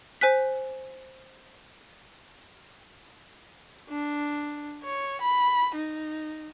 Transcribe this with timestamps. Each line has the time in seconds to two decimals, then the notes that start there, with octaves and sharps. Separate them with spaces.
0.21 C5 G#5 F#6 B6
3.89 D4
4.83 C#5
5.21 B5
5.75 D#4